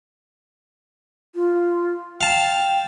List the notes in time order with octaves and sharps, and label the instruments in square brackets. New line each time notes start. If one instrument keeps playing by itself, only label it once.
[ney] F4
[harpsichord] F5 A5 [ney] G5